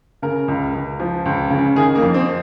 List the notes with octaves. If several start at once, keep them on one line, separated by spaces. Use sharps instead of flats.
C#3 A#4
C#2
C#2
F3
C#2
C#3
D#3 G#4
A#3
F2
C4